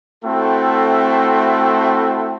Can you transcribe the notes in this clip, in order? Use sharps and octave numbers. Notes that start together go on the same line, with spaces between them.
A3 C4 E4 F#4 A4 G5